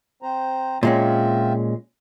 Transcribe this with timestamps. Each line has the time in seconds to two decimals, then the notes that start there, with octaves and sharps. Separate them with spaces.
0.22 C4 C5 A#5
0.83 A#2 G#3 C4 C#4 F4 E5